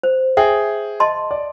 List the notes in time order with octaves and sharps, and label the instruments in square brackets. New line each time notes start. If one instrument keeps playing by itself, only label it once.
[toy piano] C5
[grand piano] G#4 G5 [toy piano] E5
[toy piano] D#5 A5 C6
[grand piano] D5